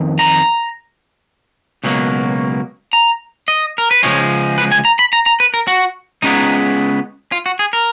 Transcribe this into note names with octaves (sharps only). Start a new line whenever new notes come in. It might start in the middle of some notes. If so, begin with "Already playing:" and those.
Already playing: F2 D#3
A#5
C#2 B2 F#3 A#3
A#5
D#5
A#4
B4
C#2 C#3 F3 G#3 C#5
B4
G#5
A#5
B5
A#5
A#5
B4
A#4
F#4
C#2 C#3 G#3 B3 D#4
F4
F#4
G#4
A#4